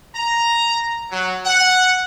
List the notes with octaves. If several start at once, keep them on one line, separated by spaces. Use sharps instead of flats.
A#5
F#3
F#5